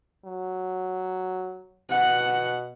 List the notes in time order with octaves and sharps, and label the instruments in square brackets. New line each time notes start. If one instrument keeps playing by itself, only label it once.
[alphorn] F#3
[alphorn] B2 [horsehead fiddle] F#5